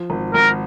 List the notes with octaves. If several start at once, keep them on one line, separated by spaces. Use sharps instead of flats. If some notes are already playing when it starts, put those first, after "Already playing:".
Already playing: F3
G#1
G#1 A#4